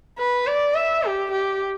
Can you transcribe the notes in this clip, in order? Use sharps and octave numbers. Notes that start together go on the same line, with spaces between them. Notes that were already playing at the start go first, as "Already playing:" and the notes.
B4
D5
E5
G4
G4